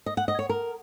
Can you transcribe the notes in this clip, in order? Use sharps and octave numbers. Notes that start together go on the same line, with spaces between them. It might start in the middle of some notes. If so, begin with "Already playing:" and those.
D#5
F#5
D#5
C#5
A#4